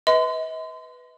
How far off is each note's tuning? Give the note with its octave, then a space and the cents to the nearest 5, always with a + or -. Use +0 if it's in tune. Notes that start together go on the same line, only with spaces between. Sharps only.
B4 +0 D#5 +45 C6 -35